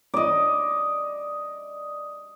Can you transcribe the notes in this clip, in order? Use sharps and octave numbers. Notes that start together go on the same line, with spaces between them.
D5 D#5